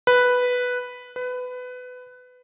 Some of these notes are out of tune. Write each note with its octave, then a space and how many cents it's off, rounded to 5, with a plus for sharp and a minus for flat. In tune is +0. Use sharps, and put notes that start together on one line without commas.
B4 +0
B4 +20